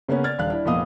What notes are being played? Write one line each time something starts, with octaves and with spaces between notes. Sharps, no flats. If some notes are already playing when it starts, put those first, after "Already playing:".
C#3 A#3 B3 C#4
D5 F6 G#6 A6
D#1 D4 F5 F#6
D4 E4
F1 A#2 B3 D#5 F5 D#6